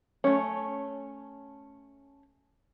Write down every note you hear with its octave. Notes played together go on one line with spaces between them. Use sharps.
A3 C#4